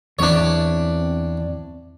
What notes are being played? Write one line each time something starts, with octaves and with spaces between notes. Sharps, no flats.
E2 C4 D4 E4 C#5